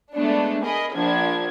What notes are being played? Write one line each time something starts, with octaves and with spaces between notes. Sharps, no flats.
G#3 A3 B3 D4
G#4 A#4 D#5 B5
A#1 F3 D4 G#6